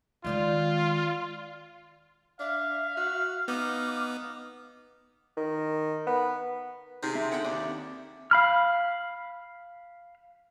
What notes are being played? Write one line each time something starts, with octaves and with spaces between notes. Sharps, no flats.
D#3 G#3 D#4 F4 D5 G5
D4 E5 F5
F#4
B3 D#4 D6
D#3
B3
C3 D#4 G#4
C4 E5
D3 F#5 G5
D#2 D5
F5 B5 F6